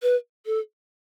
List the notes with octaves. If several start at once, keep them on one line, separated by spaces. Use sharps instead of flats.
B4
A4